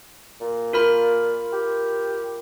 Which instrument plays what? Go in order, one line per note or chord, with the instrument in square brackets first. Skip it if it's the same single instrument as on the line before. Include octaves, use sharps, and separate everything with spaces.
[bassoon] A#2
[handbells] F4 A#4 B5
[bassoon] G4